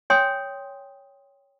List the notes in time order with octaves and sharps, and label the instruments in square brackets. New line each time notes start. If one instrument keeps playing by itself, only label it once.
[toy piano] C#5 G5 G#5 C6 D#6